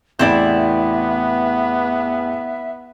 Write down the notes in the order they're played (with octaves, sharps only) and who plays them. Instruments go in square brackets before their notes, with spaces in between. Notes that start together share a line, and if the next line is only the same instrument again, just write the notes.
[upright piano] A1 E2 [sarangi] B3 [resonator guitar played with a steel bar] C4 E4 D5 [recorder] E5